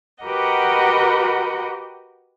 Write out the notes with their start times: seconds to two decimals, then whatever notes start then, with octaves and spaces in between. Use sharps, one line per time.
0.24 F#4 G4 A#4 B4 D#5 F#5